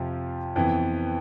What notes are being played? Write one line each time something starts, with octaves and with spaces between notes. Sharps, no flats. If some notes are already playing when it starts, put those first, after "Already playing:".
Already playing: F2 C3 F3
F2 E3 B3